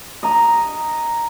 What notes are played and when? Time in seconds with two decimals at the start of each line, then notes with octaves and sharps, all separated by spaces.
0.23 D#5 A#5